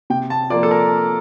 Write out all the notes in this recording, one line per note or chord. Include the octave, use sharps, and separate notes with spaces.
C3 G5
A5
F3 A#3 F4 D5
A4
A#4